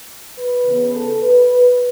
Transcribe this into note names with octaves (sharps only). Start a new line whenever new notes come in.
B4
C#3 E3 B3
A4
B4